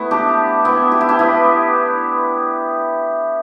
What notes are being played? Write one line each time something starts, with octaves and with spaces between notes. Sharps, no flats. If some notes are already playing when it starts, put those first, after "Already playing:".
Already playing: A3 B3 E4
D4 G4
B3 E4
G4
E4
D4 G4
B3 E4